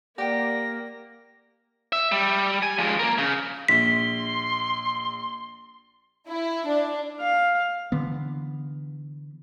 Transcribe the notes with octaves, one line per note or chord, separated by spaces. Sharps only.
A#3 G4 D5 F#5 G5 D6 A#6
E5
G3
G#5
F3 G#3
A#3 A#4
C#3
A#1 C6 B6
E4
D4
F5
D3 E3 B3